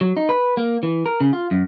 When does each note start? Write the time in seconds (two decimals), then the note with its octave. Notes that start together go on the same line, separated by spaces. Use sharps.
0.01 F#3
0.17 D#4
0.29 B4
0.57 A#3
0.83 E3
1.06 A#4
1.21 C#3
1.33 F4
1.51 F#2